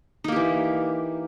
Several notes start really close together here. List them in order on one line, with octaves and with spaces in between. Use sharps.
D#4 A#3 G4 E3